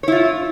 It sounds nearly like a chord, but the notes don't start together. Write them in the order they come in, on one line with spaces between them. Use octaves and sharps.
C#5 E4 F4